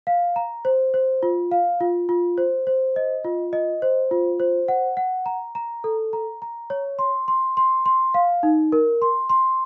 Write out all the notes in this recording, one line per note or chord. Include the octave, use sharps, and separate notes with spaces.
F5
A#5
C5
C5
F4
F5
F4
F4
C5
C5
D#5
F4
D#5
C5
F4
C5
F#5
F#5
A#5
A#5
A4
A#5
A#5
C#5
C6
C6
C6
C6
F5
D#4
A#4
C6
C6